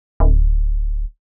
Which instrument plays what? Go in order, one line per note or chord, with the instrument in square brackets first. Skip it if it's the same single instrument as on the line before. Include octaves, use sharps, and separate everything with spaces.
[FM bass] D1